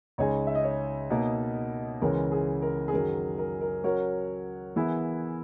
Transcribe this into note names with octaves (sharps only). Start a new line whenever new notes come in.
C#2 C#3 G#3 D#4 G#4 C#5
E5
D#5
C#5
B2 A#3 D#4
C#2 C#3 E3 G#3 C#4 A#4
G#4
A#4
G#4
F#2 D#3 F#3 A#4
A#4
A#4
F#3 C#4 F#4 A#4 C#5
E3 B3 E4 G#4